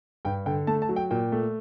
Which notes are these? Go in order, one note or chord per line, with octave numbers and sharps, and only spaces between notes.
G2 G5
D3 G5
A3 A5
A5
F#3
G5
A#2 G5
A3